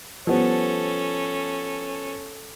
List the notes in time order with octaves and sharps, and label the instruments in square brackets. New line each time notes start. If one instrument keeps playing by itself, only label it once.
[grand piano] F3 G3 B3 [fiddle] C#4 A4